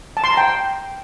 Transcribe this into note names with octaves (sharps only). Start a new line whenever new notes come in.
A5
C6
A#5
G5